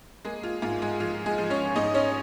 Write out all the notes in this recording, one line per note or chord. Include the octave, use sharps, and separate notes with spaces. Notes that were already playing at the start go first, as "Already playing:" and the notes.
G#3 A#3 G#4
F4
G#2 F4
G#3 G#4
F3 F4
G#3 G#4
F3
C#4 C#5
G#2 D#4 D#5
C#4 C#5